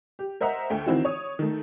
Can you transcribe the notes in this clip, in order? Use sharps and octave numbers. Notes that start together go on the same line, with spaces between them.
G4
A#4 C5 D#5 E5 F#5 A#5
D2 A3 G5
D#3 E3 C4 E4 F#4
C#5 D#6
D#3 A3